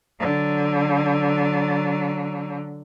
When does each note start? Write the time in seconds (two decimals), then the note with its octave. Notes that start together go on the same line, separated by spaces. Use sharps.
0.20 D3 F#3